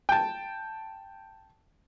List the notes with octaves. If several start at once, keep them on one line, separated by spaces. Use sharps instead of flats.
G5 A5